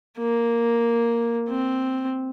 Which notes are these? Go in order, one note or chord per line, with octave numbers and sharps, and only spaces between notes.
A#3
C4